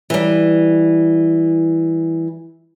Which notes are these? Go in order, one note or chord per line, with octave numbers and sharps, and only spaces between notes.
E3 G3